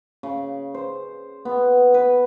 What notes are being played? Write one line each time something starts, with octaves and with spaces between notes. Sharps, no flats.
C#3
C5
B3
B4